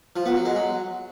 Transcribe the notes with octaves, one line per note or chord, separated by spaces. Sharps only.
F3
B3
F#3
G#3
F#3